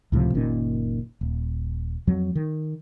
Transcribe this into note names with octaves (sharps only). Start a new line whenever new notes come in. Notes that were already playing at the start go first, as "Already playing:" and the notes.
C#2 A2 C3 F3
F#1 A#2 D#3 C#4
D#1
F2 F#3
D#3